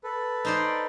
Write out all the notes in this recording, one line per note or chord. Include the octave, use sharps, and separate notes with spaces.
A4 B4
D#4 C5 D5